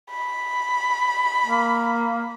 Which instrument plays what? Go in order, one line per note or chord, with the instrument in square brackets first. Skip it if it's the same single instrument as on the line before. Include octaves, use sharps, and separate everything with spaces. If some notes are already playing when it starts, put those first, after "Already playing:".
[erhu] B5
[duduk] A#3